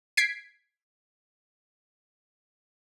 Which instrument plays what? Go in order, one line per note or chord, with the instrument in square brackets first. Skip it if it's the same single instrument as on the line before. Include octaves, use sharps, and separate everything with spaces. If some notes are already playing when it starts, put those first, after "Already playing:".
[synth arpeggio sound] G#6 B6 C7 D7